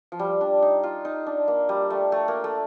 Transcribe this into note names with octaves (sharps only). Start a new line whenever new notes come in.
F3
G3
D4
D#4
F4
D#4
D4
A#3
G3
A3
A3
A#3
A3